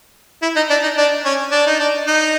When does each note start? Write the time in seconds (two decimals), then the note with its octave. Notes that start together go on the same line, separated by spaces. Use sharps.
0.42 E4
0.56 D#4
0.70 D4
0.83 D#4
0.97 D4
1.25 C#4
1.52 D4
1.66 D#4
1.80 D4
2.07 D#4